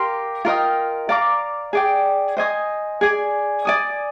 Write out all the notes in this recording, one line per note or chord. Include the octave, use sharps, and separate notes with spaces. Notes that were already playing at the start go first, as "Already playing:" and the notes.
Already playing: G4 A#4 F5 C6
F4 A#4 D#5 G5
D5 F5 A#5 D6
G#4 D5 G5
C5 D#5 G#5 D#6
G#4 D5 G#5
D5 G#5 D#6